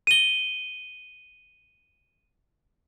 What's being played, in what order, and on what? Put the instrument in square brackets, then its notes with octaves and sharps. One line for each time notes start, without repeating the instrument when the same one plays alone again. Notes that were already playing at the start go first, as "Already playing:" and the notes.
[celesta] D#7 G7